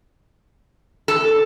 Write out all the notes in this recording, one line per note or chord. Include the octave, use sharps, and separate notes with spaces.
A4